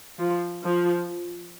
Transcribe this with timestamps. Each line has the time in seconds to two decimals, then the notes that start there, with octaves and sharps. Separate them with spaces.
0.19 F3
0.63 F3